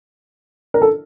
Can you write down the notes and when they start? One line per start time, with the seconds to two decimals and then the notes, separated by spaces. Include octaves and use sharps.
0.74 A#4
0.82 A4